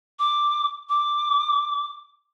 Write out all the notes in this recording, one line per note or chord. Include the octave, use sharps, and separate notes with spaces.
D6
D6